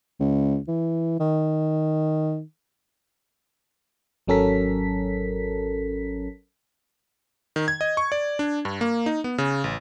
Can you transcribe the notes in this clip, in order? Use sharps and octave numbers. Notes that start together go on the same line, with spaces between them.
C#2
E3
D#3
G#1 F#3 C#4 A4 A#4 B6
D#3
G#6
D#5
C#6
D5
D4
G2
A#3
D#4
B3
C#3
A1